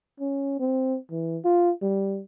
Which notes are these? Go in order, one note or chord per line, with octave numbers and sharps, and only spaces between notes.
C#4
C4
E3
F4
G3